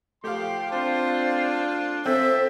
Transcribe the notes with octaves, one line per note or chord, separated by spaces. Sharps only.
F3 A3 G4 F5 C6
C4 D4 F4 C5
C4 A4 C5 E5